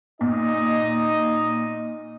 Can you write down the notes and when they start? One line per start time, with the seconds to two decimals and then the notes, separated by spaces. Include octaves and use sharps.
0.21 A#2 D#4 D#5